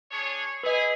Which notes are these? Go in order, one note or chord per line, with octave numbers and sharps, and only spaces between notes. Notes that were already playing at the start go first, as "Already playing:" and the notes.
D4 G#4 C#5
G#4 B4 D#5 B5